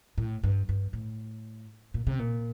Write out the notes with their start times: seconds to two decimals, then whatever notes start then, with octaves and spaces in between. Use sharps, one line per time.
0.18 A2
0.43 G2
0.69 G2
0.93 A2
1.94 A#2
2.07 C3
2.19 A#2